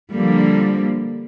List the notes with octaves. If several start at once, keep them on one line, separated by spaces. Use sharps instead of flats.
D3 F3 G3 A#3